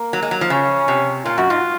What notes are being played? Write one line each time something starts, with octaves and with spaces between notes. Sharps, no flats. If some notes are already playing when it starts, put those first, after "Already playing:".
Already playing: A#3
F#3
G#3
F#3
F3
C#3 C#4
C3
A#2 F4
F#2 F#4
G#2 F4